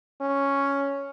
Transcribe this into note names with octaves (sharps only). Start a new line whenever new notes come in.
C#4